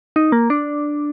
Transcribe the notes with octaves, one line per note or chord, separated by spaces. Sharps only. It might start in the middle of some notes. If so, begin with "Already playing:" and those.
D#4
A#3
D4